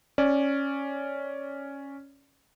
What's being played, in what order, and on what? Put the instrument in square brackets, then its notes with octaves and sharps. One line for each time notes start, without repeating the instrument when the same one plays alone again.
[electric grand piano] C#4 D5